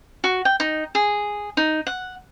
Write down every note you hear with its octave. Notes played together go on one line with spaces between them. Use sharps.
F#4
G5
D#4
G#4
D#4
F#5